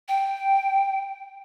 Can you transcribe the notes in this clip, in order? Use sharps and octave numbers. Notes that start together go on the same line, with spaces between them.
G5